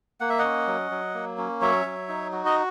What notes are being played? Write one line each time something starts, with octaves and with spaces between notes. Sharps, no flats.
A#3 F#5
E5
D#5 F#5
C#4
F#3
F#3
A#3
C#4
F#3 C#5 E5
F#3
D#4
F#4
D#5